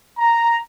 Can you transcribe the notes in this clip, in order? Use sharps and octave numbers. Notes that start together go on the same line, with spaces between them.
A#5